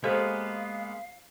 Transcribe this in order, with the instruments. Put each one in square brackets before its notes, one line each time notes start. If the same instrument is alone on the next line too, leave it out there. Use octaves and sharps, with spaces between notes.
[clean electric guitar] G#3 A#3 B3 [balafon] G4 A4 C5 [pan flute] F5